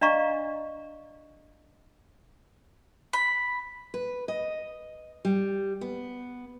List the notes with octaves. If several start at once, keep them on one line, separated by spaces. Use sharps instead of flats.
D4 D5 D#5 F5 A#5 C#6
B5
B4
D#5
G3
B3